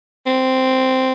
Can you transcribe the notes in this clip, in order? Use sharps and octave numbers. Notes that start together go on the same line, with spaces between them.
C4